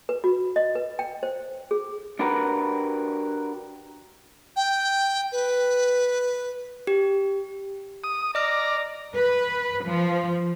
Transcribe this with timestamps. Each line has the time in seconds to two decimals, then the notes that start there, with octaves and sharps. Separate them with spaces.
0.09 B4
0.24 F#4
0.56 D#5
0.75 B4
0.99 G5
1.23 C5
1.71 G#4
2.19 D4 F#4 G4 A#4 B4
4.56 G5
5.32 B4
6.87 G4
8.04 D#6
8.35 D5 D#5 A#5 F6
9.14 B4
9.85 F3